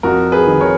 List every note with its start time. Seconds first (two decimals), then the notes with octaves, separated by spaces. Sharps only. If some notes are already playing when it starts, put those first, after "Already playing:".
0.03 F2 F#4 A#4
0.32 G#4 B4
0.47 D#3
0.61 A#4 C#5